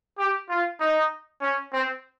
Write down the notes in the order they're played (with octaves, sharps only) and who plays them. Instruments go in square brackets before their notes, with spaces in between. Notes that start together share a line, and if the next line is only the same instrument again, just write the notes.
[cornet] G4
F4
D#4
C#4
C4